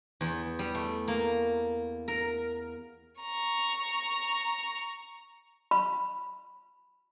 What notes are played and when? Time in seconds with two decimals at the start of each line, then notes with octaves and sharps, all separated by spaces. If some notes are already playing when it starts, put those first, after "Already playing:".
0.21 E2
0.59 G3
0.75 A3
1.08 A#3
2.08 A#4
3.21 A#5 C#6
5.71 B5